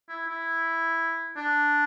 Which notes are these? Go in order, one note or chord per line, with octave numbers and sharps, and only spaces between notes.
E4
E4
D4